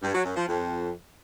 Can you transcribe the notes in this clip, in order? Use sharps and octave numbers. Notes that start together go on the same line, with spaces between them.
G2
F#3
F#2
F3
F2